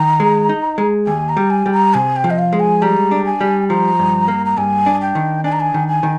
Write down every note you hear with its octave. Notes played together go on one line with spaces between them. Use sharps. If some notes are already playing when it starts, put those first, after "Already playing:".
Already playing: D#3 A#5
G#3
D#4
G#3
D#2 G#5
A#5
G3
G#5
G3
A#5
C3 G#5
G5
F3
D#5
F5
G#3
G#5
G3 A#5
D4
G#5
G3
F3 A#5
G2
A#3
A#5
G2 G#5
D4
G5
D#3
D4 G#5
A#5
G#5
D#3
G#5
D#3